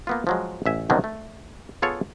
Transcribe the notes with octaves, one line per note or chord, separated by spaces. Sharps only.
A#3 B3 F4
F3 F#3 G#3
A1 E5 G#5
C2 B2 D3 D#3 F#3
A3
B3 F4 G#4 A4 C#5